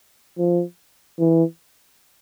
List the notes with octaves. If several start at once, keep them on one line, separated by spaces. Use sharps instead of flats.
F3
E3